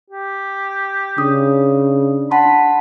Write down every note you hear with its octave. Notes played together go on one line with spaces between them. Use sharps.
G4
C#3 D4 D#6
F#5 A5 B5 C6